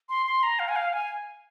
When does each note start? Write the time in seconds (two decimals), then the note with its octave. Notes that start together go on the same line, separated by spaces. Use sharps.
0.09 C6
0.26 C6
0.43 A#5
0.59 F5
0.69 G#5
0.76 F5
0.93 G#5